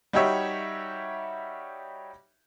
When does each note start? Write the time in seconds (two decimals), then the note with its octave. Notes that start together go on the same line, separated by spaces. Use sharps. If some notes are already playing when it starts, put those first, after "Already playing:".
0.13 G3 D#4 F#4 G4 C#5 E5